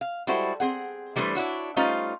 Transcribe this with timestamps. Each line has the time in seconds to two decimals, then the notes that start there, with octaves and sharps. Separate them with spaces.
0.01 F5
0.27 G3 G#3 E4 F#4 A4 C5
0.60 C4 G#4 F#5
1.16 E3 G3 A3 D4 B4 C5
1.35 D4 E4 F#4 C#5
1.76 G3 A3 C#4 D#4 F4 C5